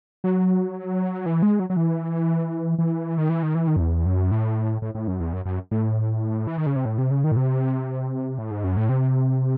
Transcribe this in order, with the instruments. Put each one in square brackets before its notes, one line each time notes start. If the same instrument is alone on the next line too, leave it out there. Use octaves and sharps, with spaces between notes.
[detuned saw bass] F#3
E3
G#3
F#3
F#3
E3
E3
D#3
E3
D#3
E3
D#3
F#2
E2
F#2
A2
A2
A2
F#2
E2
F#2
F#2
A2
E3
D#3
C#3
C3
A2
C3
C#3
D#3
A2
C3
A2
G#2
F#2
A2
C3